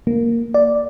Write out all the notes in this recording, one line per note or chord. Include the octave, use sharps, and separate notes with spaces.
A#3
D5